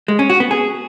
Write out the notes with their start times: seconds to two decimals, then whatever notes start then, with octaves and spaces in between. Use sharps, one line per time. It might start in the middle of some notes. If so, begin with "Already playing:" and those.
0.08 G#3
0.19 C#4
0.30 F#4
0.40 B3
0.51 G#4